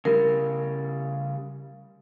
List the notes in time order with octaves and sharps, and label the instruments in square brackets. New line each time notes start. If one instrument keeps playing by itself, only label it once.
[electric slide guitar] C#3 G3 [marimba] A#4